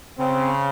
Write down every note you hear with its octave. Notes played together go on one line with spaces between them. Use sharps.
C#3 C4